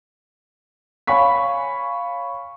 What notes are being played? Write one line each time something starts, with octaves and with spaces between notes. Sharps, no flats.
C#5 F5 G#5 B5 C#6 B6